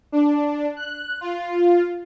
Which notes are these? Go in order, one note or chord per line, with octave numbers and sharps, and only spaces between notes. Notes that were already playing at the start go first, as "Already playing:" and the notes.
D4
F#6
F4